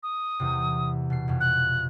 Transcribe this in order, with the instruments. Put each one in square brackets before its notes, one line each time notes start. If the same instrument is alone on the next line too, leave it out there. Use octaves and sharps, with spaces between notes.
[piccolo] D#6
[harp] E2 C3
B2 C7
F2 B2
[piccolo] F#6